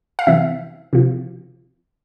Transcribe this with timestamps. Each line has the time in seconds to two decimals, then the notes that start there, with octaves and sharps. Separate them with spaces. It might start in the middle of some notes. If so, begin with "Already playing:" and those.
0.19 F5
0.27 C3 E3 E5
0.93 C3 F3